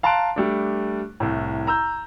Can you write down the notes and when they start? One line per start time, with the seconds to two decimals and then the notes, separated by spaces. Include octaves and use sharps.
0.03 F5 A5 A#5 C6 F#6 D7
0.36 G3 A3 D4
1.20 C2 A2
1.67 A#5 E6 G6